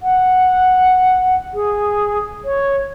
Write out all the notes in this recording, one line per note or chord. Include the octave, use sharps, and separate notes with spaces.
F#5
G#4
C#5